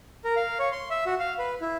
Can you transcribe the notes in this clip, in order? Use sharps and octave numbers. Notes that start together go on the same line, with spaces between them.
A#4
F5
C#5
C6
E5
F#4
F5
B4
E4